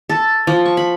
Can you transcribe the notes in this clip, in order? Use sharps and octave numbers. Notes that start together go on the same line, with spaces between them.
A4
F3
C#6
B5